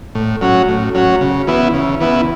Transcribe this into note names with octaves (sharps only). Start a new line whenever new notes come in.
A2
F#3 C#4 F#4
A2
F#3 C#4 F#4
C#3
E3 B3 E4
C#3
E3 B3 E4